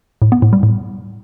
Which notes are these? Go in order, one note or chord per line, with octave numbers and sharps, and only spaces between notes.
A2
B3
A2
G3
A2